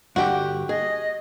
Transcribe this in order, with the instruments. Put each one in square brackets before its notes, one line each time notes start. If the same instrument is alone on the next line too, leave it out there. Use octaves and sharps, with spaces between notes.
[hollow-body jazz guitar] G2 D3 G5 [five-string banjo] F#4 G4
[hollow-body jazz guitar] G#4 [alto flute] D#5